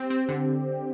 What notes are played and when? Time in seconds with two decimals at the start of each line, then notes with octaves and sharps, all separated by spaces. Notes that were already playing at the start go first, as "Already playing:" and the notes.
Already playing: C4 G4
0.10 C4
0.29 D3